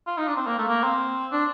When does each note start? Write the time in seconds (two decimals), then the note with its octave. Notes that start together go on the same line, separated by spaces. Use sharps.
0.07 F4
0.18 D#4
0.28 D4
0.36 C4
0.47 A#3
0.58 A3
0.68 A#3
0.84 C4
1.32 D4